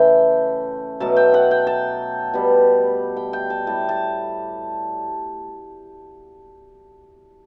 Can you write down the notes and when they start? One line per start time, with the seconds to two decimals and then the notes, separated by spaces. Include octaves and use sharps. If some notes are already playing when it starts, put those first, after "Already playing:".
Already playing: C#3 E3 A3 G5
1.00 B2 F#3 A3 A5
1.17 G5
1.34 F#5
1.51 G5
1.67 A5
2.34 B2 G3
3.17 G5
3.33 G5
3.50 A5
3.67 A2 G3 A5
3.89 A5